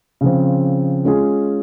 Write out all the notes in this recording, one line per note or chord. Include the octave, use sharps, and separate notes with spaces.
C#3 F3 C4
G#3 C#4 F4 G#4